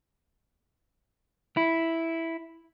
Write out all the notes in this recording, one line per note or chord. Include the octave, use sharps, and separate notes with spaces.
E4